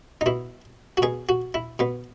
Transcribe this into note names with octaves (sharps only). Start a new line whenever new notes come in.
D#4
B2 E4
F#4
B2 G#4
F#4
E4
B2 B3